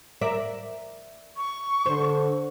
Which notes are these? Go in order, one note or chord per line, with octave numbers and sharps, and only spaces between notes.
A#4 D5 E5
C#6
D3 C5